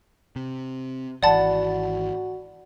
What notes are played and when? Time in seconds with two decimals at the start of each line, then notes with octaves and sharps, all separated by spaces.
0.36 C3
1.23 G#1 E3 F#4 D5 F#5 A5 B5 A6